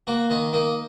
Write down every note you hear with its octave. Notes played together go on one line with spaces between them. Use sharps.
A#3 F#4
D#3 D#4
A#3 D#4